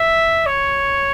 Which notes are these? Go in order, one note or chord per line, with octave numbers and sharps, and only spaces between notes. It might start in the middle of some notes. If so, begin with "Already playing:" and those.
Already playing: E5
C#5